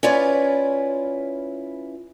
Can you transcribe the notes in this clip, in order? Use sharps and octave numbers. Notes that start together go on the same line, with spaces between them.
C#4 E4 F4 B4 C#5 D5